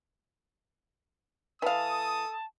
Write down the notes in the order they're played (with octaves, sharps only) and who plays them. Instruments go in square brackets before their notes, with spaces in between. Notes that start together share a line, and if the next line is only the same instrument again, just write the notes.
[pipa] E3 F5 [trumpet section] A4 D#6 [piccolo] A5